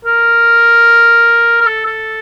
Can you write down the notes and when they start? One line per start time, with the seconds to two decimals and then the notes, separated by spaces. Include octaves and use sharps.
0.05 A#4
1.61 A#4
1.66 A4
1.86 A4